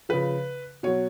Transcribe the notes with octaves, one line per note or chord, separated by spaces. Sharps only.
C#3 F3 B4
B2 F#3 C#5